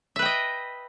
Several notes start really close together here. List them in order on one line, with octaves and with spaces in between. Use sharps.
E5 B4 G5 D#5